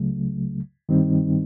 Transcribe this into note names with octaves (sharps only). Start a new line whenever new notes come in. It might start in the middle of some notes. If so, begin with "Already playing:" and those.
Already playing: C#2 C#3 F#3 A3
G2 D#3 G3 C4 D#4